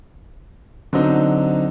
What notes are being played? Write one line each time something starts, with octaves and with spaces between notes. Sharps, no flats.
D3 F#3 C4 D#4